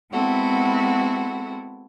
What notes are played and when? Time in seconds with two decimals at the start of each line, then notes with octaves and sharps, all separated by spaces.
0.12 G#3 B3 C4 E4 F#4 A4